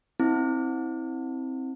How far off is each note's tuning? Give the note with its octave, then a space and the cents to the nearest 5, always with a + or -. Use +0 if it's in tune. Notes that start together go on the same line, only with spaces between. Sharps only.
C4 +10 E4 -25